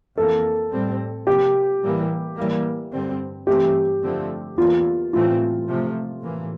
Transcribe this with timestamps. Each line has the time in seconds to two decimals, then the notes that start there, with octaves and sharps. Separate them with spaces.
0.17 F2 E3 A#3 A4
0.72 A2 G3 C4
1.27 C3 F3 A#3 G4
1.82 A2 E3 G3 A#3
2.37 A2 E3 G3 A#3
2.92 G2 D3 G3 C4
3.47 G2 E3 A3 C4 G4
4.03 F2 D3 F3 A3 C4
4.58 E2 E3 A#3 F4
5.13 A2 E3 A3 C4 F4
5.68 C3 F3 A3
6.23 A2 E3 A#3